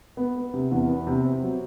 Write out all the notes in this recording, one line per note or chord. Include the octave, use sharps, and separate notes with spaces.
B3
B3
C3
E2
B3
C3
C4
F#3